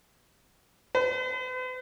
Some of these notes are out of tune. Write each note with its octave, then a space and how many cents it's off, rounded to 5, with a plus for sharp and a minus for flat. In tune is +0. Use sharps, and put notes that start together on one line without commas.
B4 +45